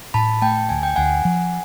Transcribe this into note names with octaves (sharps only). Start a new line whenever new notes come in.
A2 A5 B5
A3 G5 A5
D2 G#5
G5
D2 F#5 G#5
F3